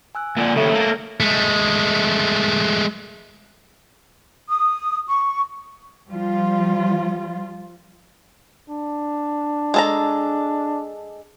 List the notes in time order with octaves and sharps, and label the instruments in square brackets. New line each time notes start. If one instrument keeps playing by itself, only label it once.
[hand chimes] G#5 E6 F#6
[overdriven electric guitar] A#2 D3
[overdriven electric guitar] D#2 C#3 [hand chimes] A4 C#5 E5
[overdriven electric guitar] A3 A#3
[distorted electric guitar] G#3 A3
[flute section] D#6
C#6
[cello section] F3 G3 F4
[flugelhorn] D4
[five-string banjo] G#3 A4 A#5